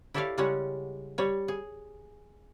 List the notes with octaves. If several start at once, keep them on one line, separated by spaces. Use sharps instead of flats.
E4 G4 A4 C#5 D5 F5
C#3 G3 G#3 C#4 C#5 F#5
G3 C#5
G#4